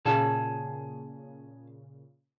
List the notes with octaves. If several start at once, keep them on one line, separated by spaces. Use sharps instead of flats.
A#2 C#3 G#4 A5